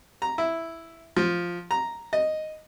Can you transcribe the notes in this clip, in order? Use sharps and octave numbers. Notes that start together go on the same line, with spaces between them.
A#5
E4
F3
A#5
D#5